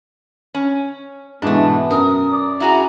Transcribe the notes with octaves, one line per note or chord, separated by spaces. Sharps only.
C#4
G#2 B2 E3 A3 B3 D4
F#2 A#4 D#6
D5
E4 F#4 G#4 A#5